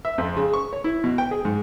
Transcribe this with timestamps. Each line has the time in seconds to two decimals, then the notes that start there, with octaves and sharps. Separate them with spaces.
0.05 E5
0.18 F2
0.37 C#3
0.53 C#6
0.73 C#5
0.84 E4
1.04 B2
1.18 G5
1.31 G#4
1.45 G#2